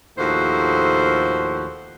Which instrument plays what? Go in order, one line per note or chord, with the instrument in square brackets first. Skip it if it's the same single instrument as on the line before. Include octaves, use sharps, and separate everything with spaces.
[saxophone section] D#2 A2 F3 F#4 A4 C5